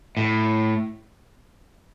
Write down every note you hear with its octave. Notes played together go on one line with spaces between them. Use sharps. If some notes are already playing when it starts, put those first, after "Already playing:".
A2